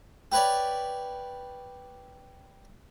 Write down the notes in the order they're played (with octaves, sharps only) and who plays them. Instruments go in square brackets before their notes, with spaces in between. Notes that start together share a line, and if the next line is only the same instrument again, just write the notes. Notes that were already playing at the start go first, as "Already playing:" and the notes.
[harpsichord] G4 B4 C#5 D5